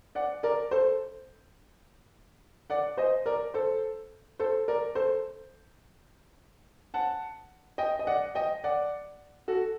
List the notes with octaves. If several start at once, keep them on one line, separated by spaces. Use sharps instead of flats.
D5 F#5
A#4 D5
A4 C5
D5 F#5
C5 D#5
A#4 D5
A4 C5
A4 C5
A#4 D5
A4 C5
F#5 A5
D#5 G5
D#5
D5 F#5
D#5 G5
D5 F#5
F#4 A4